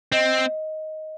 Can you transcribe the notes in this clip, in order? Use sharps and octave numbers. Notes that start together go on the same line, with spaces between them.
C4 D#5